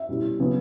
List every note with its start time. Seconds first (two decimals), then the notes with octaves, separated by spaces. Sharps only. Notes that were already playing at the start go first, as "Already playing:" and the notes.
Already playing: E5
0.09 B2 G3 C#4 E4
0.39 C#3 F#3 B3